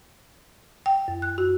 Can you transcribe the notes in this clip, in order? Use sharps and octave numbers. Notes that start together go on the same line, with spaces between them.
G5
F#2
F#6
F#4